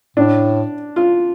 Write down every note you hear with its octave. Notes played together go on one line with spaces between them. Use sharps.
A2 D4
F4